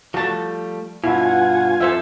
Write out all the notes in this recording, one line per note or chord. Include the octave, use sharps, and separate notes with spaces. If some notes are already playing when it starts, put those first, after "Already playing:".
F3 G3 A3 F#4 A5
G2 B2 E4 F4 F#5 G#5
F2 F3 A4 C5 E5